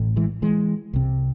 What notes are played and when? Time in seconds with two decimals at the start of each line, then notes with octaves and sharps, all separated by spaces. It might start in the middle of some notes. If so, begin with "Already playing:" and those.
Already playing: A1 A2
0.16 E3 G#3
0.42 E3 G#3
0.93 C2 C3